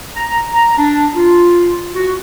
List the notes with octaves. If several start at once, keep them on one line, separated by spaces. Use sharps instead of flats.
A#5
A#5
D4
F4
F#4